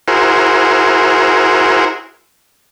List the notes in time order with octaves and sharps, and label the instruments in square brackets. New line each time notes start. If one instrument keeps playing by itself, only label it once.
[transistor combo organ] E4 F#4 G#4 A#4 C5